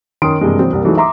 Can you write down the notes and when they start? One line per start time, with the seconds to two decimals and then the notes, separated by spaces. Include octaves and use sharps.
0.22 D#3 C#4 C6 D#6 D7
0.40 G2 C3 E3 G#3 A#3
0.58 C3 E3 F#3 C4
0.72 C2 G3 A#3
0.85 E3 F#3 G#3 A3 D#4
0.97 E5 A#5 C6 D6